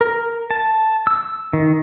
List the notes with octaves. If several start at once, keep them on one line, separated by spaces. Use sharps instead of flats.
A#4
A5
E6
D#3